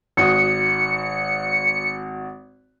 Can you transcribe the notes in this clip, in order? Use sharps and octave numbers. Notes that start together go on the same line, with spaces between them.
G#1 F#4 D#6 C#7